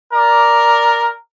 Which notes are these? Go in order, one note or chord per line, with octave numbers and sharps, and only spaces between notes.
A#4 D5